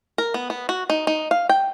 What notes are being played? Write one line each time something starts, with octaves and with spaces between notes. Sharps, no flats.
A#4
B3
B3
F#4
D#4
D#4
F5
G5